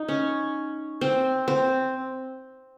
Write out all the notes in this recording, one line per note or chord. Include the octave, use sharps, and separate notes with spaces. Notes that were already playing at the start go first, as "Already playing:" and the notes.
Already playing: D#4
C#4
C4
C4